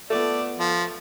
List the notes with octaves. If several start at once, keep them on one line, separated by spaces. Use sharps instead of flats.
A3 B3 F4 A4 D5
F3 A3